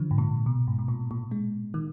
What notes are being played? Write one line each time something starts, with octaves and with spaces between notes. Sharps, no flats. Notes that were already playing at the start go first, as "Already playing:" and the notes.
Already playing: D3 F3
G#2
A#2
B2
G#2
B2
A#2
A#2
G#3
D#3